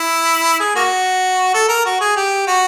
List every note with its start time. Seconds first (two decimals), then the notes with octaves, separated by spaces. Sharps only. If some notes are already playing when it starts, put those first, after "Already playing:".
Already playing: E4
0.60 G#4
0.76 A#3 F#4
1.54 A4
1.69 A#4
1.85 F#4
2.01 G#4
2.16 G4
2.47 F#4